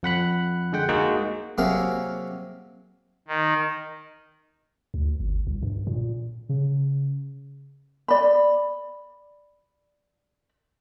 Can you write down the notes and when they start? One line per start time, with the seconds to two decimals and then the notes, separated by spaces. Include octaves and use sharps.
0.03 F2 F#5 B5 F#6
0.72 D3 G#3 F#5 G5
0.89 G#3 A#3 D#4 F#4
1.58 C3 F#3 A#3 G#4 A#4 E5
3.28 D#3
4.94 D2
5.20 G1
5.47 C2
5.63 G2
5.87 A#2
6.49 C#3
8.08 D5 B5